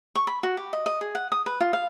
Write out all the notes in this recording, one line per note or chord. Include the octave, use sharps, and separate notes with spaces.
C#6
B5
F#4
G4
D#5
D#5
G#4
F#5
D#6
B4
F4
F5